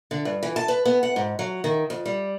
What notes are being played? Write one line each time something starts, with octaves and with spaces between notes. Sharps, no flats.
D3
G2
E3
A5
B4
B3
F#5
G#2
F#3
D#3
F2
G3